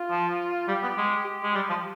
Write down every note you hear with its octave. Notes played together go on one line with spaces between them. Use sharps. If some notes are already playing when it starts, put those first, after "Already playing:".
Already playing: F4
F3
G3 G4
B3
G#3
G4
G#3
G3 G4
F3